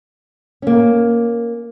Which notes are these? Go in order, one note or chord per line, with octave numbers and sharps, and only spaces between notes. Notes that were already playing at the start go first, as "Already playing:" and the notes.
A#3 C#4